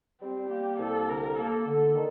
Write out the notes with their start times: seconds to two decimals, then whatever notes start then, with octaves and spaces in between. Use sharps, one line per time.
0.21 G3 C4
0.50 A#3 G4
0.79 C2 A4
1.08 D3 A#4
1.37 A#3 A4
1.66 D3 A4
1.95 D#3